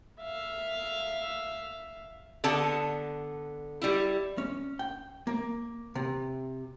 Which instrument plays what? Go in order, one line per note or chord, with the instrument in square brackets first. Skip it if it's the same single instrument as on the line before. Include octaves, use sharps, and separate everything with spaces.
[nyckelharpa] E5 F5
[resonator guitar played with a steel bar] D3 B3 A5
G3 E4
[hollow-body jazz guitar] C#4
G5
A#3
C3